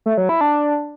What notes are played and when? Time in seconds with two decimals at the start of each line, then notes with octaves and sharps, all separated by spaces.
0.06 A3
0.17 F#3
0.29 E4
0.41 D4